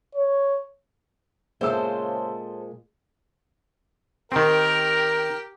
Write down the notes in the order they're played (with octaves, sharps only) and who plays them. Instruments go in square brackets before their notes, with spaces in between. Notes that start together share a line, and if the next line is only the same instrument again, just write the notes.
[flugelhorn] C#5
[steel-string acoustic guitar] A#2 G#3 [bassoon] C#3 [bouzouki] A4 C5 [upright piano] E5 E6
[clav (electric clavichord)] D#3 C4 [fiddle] G4 G5 [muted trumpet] A#4